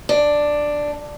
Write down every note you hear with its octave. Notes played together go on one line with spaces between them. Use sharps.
D4